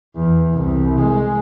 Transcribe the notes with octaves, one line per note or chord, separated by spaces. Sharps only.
E2
C2
G#3